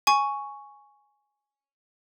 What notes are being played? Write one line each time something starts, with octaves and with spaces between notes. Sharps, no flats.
G#5 C#6